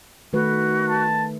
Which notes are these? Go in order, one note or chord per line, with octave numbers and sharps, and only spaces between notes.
D#3 A3 F#4 B4
A5